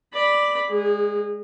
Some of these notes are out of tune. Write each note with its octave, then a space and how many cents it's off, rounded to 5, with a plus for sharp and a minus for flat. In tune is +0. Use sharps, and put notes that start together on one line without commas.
D5 +0 B5 +0
G#3 +0 G#4 -30